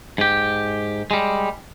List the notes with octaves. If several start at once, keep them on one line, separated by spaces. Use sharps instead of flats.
G#2 G4
G3 G#3